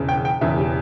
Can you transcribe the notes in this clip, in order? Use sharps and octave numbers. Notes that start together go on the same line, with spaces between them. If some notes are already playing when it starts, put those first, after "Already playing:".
Already playing: E1 E2 C#3
G5
G5
E1 E2 C#3 E5
G4